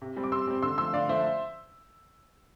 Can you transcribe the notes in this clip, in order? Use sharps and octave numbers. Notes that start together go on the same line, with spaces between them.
C3
G3 C4
D6
C3 C6 E6
G3 C4
D3 C6 E6
F3 A3 C6 E6
D3 D5 F5
F3 A3 C5 E5